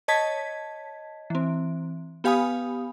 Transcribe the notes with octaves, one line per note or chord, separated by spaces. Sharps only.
C#5 D#5 A5 G#6 B6
E3 C4
B3 G4 F5 G#5 B5 D#6